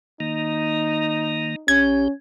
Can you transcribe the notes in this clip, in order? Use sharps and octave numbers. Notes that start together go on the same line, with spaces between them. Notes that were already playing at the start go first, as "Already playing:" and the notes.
D#3 A#3 D#4
A#1 C#4 G4 G#6